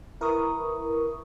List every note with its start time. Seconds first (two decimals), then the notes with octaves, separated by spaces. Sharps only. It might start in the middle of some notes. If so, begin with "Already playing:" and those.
0.21 E4 A#4 B4 C#6 D#6